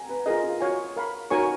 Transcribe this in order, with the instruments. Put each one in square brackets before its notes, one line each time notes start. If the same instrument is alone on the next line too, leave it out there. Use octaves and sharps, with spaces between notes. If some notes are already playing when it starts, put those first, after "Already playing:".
Already playing: [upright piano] G#5 A#5
B4
[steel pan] F4 A#4 D#5 [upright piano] G#4
[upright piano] F4
[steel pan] F#4 C#5 F5 G#5
A#4 F5 B5
[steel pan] D#4 A#4 C#5 G#5 C#6 [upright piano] F#4